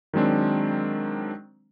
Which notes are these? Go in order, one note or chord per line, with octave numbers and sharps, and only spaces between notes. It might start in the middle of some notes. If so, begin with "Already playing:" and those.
D#3 F#3 G#3 C4 D4